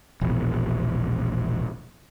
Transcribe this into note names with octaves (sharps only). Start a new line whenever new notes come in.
E1 A#1